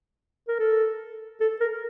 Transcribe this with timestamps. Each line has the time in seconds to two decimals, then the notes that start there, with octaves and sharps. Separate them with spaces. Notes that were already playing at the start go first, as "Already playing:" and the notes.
0.48 A#4
0.60 A4
1.41 A4
1.60 A#4